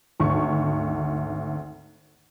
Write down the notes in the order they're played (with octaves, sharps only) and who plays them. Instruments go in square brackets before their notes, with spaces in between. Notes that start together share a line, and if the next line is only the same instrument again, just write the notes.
[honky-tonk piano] G#1 D2 C#6